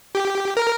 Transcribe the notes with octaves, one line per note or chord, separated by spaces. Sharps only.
G4
A#4